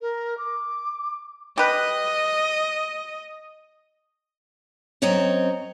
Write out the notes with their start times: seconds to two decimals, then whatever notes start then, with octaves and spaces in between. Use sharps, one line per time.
0.01 A#4
0.38 D6
1.58 G4 B4 D#5
5.02 F#2 C4 C#5 D#5 A#5